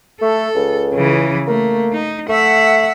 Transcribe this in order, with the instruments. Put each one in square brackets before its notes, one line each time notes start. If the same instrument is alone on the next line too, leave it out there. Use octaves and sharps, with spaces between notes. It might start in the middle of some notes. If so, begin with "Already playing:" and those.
[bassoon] A3 [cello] A4
[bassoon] C#2
[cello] C#3 E3
[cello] A3 [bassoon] A#3
[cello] D#4
[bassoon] A3 [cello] E5 F#5